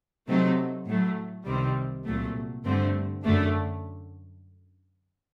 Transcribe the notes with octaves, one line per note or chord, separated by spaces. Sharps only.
C3 F#3 A3 C4 D#4
A2 F#3 A3
C2 C3 D#3 G3 C4
C2 A#2 F#3 A3
G2 D3 A3 C4
F#2 D3 A3 D4